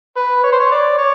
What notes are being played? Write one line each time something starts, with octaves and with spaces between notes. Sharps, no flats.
B4
C#5
C5
C#5
D5
C#5